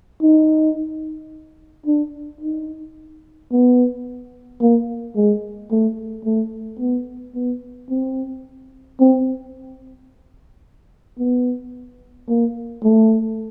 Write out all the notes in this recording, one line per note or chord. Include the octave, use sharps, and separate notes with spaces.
D#4
D4
D#4
B3
A#3
G#3
A3
A3
B3
B3
C4
C4
B3
A#3
A3